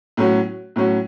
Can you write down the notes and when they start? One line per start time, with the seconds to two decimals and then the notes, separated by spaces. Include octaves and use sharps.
0.17 A2 F#3 C#4 F#4
0.76 A2 F#3 C#4 F#4